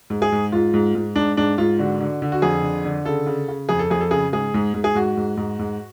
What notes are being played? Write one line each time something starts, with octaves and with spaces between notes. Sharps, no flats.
G#2
G#4
G#2
G#2 F4
G#2
G#2
G#2 D4
G#2 D4
G#2 F4
D3 F#4
D3
D3
F#4
F2 G#4
D3
D3
C#3 A4
C#3
C#3
F2 G#4
A4
F2 G#4
A4
C#3 G#4
G#2 G#4
G#2
G#2
G#4
G#2 F#4
G#2
G#2
G#2